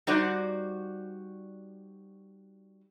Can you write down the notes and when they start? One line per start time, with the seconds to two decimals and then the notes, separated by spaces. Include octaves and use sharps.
0.07 G3 D#4 F#4 C5 D5 F#5